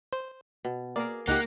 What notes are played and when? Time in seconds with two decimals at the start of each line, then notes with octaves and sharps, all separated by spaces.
0.13 C5
0.65 B2
0.96 A#3 G#4 A#4 D5
1.28 C#2 A#3 D#4 G4 F#5